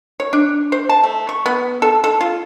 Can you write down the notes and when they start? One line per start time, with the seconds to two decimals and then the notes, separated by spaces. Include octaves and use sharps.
0.20 C#5
0.33 D4
0.72 C5
0.89 A5
1.03 A3
1.29 C#6
1.46 B3
1.82 A4
2.04 A4
2.21 F4